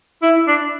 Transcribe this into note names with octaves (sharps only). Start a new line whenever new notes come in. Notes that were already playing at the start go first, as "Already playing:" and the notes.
E4
D4